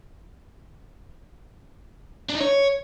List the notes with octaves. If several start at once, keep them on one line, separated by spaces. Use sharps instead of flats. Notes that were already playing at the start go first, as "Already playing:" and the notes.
D4
D#4
C#5